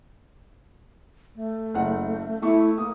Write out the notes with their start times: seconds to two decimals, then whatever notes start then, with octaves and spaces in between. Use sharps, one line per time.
1.36 A3
1.74 F#1 F#5
2.42 A3 E4 C#6
2.78 A#3 D#6